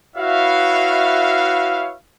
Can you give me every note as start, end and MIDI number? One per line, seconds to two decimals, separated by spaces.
0.16 1.94 64
0.16 1.94 66
0.16 1.94 71
0.16 1.94 73
0.16 1.94 76
0.16 1.94 77